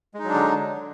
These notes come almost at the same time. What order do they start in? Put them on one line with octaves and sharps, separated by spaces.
G#3 D#4 F#3 D4 D3